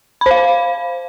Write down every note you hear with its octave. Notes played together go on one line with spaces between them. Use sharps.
C5 F5 B5